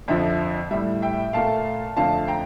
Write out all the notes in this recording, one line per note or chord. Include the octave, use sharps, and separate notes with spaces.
F2 D3 F3 E5
A2 G3 E5
E5 G5
A#2 A3 F5 A5
F2 D3 F3 A3 F5 A5
G5 A#5